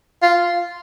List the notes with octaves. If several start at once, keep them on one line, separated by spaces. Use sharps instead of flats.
F4